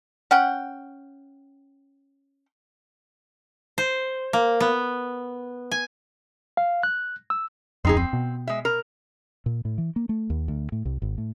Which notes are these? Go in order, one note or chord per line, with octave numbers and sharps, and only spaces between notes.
C#4 F#5 G5
C5
A#3
B3
G#5
F5
F#6
E6
D1 F2 C4 D#4 G#4
C4
B2
G#3 E5
A#4
A#2
A2
E3
A#3
A3
D#2
D2
A2
C2
G#1
A2